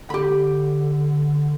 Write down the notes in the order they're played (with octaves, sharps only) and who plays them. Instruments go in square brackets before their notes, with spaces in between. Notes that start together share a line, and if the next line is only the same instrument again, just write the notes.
[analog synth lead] D3 [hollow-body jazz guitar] G4 B5